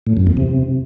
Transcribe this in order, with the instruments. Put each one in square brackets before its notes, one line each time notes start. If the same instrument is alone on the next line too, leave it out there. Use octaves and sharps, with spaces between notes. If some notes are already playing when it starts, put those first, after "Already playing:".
[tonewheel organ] A2
F#2
E2
C3